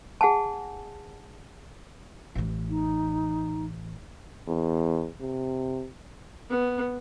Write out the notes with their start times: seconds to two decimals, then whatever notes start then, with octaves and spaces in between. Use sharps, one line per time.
0.21 G#4 F#5 G#5 A5
2.35 A1 E3
2.69 D#4
4.47 E2
5.21 C3
6.50 B3